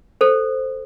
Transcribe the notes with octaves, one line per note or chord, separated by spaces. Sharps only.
A4 C5